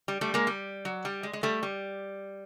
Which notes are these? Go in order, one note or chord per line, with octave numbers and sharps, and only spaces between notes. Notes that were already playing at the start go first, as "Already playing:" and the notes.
G3
G3 A3
G#3 A#3
G3
F#3
G3
G#3
G#3
G3 A3
G3